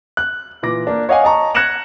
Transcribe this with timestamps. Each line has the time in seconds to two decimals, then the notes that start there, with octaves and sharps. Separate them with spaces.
0.17 F#6
0.63 A#2 E3 D6 A#6
0.87 A#3 D4
1.09 C#5 D#5 F5 F#5 G#5 D#6
1.24 D#5 A5 A#5 C#6
1.55 F#6 G#6 A#6 C#7 E7 F#7